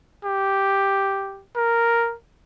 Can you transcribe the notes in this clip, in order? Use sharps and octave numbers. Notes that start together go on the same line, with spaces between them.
G4
A#4